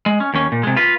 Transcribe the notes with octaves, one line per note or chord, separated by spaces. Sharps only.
G#3
C#4
D#2 C#4
A#2
C3 G#3
F4 B4